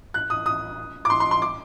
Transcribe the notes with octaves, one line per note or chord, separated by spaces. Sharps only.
F#6
D#6
D#6
D6
C6
C6
C6
D6